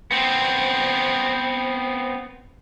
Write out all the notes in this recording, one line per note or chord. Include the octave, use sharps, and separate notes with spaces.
B3 C4